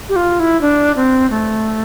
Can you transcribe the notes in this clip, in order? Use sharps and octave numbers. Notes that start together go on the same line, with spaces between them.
G4
F4
E4
D4
C4
A3